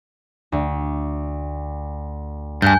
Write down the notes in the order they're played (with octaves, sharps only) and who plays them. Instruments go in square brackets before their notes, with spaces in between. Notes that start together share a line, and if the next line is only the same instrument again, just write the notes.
[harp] D2
[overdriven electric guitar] G2 [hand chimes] G#5 G6 [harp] F#6